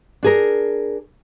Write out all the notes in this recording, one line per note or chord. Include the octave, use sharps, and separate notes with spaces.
D4 G#4 A#4